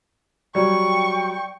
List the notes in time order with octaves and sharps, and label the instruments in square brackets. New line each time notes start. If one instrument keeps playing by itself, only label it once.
[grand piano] F#3 G3 [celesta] D5 [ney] G5 [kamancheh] C#6